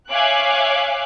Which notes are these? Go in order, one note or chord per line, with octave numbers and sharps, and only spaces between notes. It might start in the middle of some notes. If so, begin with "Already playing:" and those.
C#5 E5 F5 G#5 D6 F#6